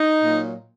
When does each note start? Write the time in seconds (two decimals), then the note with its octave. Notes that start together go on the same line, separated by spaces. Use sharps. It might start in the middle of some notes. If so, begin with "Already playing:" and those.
Already playing: D#4
0.22 A#2 F#3